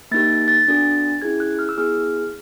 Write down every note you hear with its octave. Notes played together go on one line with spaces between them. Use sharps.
A#3 D#4 G4 A6
A6
B3 D4 F#4 A4
C#4 E4 G#4 G#6
F#6
F6
E6
B3 E4 G#4 F6